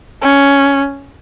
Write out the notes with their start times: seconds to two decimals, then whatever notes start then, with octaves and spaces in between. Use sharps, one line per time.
0.22 C#4